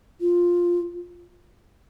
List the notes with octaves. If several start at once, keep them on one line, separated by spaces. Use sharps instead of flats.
F4